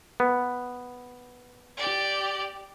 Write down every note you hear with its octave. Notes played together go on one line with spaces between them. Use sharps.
B3
G4 D5